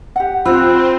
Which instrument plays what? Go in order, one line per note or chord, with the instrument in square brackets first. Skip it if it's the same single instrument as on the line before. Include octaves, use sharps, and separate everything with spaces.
[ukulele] G4 F#5
[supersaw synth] C4 [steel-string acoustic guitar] F4 [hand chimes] B5 E6 F#6